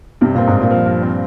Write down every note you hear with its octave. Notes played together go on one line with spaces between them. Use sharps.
G2 C3
A#2 C4
G#2
G2
A#2
F3
G2
C4